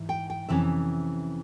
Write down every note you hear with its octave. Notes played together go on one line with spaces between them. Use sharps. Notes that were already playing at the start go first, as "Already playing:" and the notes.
Already playing: G#2 E3
G5
G5
F2 C3 E3 C#4 E5